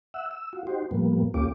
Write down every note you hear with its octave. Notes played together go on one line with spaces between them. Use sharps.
E5 F#5 E6
E6
F4 F#4
D#4 F#4 G4 C5
A2 F3 G3 A#3 B3
D2 A#3 C#4 F4 G4 D6